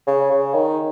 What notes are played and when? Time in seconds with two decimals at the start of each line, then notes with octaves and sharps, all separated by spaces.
0.07 C#3
0.31 C#3
0.54 D#3